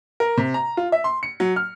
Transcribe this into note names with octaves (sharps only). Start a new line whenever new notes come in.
A#4
C3
A#5
F4
E5
C6
C#7
F#3
F6